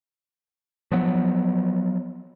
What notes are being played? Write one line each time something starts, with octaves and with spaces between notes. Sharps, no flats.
F3 F#3 B3